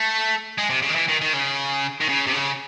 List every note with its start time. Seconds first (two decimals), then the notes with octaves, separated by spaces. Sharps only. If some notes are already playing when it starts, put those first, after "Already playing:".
Already playing: A3
0.58 G#3
0.70 C3
0.82 C#3
0.89 D#3
0.95 E3
1.08 D#3
1.21 D#3
1.33 C#3
2.01 D#3
2.09 C#3
2.27 C3
2.33 C#3